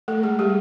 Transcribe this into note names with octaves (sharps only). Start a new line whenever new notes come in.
A3 A4
G#3 G#4
G3 G4